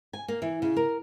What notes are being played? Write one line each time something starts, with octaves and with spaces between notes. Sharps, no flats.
G#5
A#3
E3
C#3
A#4